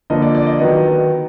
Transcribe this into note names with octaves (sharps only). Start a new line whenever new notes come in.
D3 F3 A#3 D#5
D5
D5
D#5
D#3 F#3 B3 D#5